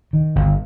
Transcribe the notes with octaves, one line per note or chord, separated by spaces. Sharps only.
D#3
G1